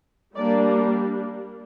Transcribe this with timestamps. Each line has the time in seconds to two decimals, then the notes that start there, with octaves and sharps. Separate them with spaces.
0.35 G3 A#3 D4 D5